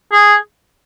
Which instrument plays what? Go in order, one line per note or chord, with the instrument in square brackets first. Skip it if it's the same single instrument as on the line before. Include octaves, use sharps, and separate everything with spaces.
[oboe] G#4